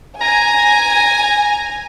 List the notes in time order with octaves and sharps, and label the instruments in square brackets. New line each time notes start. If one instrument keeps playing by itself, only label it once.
[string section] G#5 [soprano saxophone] A#5